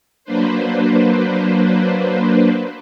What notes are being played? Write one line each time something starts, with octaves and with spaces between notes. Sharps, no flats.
F#3 A#3 D4 B4 C5